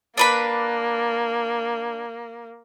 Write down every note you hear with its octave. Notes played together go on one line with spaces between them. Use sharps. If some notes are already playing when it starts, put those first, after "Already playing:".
A#3 D4 B4 B5